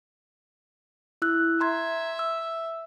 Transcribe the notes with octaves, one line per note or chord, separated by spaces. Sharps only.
E4 E6 F#6
E5 A#5 C6 G#6
E6